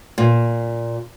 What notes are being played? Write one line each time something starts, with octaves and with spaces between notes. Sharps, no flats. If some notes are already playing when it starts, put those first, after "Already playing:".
A#2